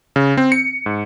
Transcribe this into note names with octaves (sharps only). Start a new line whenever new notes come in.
C#3
C4
C#7
G#2